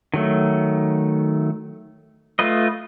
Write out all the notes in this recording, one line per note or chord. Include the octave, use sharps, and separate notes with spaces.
D#3 F#3 A3
A3 F4 B4 D#5